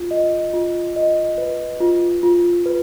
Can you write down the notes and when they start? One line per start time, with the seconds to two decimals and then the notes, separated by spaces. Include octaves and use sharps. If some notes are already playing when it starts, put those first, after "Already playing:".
Already playing: F4
0.11 D#5
0.53 F4
0.96 D#5
1.38 B4
1.80 F4
2.23 F4
2.66 B4